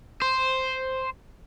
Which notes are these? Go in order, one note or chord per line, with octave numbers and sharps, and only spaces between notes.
C5